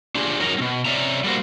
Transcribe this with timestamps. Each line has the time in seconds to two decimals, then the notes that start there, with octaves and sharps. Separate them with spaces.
0.15 D4 F4 G4 G#4
0.40 F#2 F#3 D#4 A#4 A#5
0.58 B2 C4
0.85 C3 C#4 D5 E5 A#5
1.24 G3 A3 A#3 F#4 C5